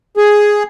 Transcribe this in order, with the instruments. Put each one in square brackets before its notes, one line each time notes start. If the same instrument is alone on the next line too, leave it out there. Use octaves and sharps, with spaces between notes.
[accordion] G#4